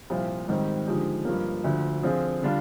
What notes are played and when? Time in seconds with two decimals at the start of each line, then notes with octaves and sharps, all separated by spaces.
0.10 C2 A#2 F3 C4 F4
0.48 G#2 D#3 G3 C4
0.87 D3 F3 G#3 D#4 G4
1.25 G2 F3 A#3
1.64 D2 D3 F3
2.03 D3 F3 C4 F4 G#4
2.42 D3 G3 D4 F4